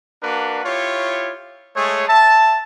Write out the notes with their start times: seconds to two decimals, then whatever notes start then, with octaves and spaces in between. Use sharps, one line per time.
0.23 A#3 D4 F#4 A#4 B4
0.65 E4 F4 G4 C#5
1.76 G#3 A3 G#4 C#5
2.08 E5 A5